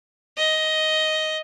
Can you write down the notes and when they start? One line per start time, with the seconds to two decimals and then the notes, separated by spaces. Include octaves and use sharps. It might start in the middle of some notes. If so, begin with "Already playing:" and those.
0.37 D#5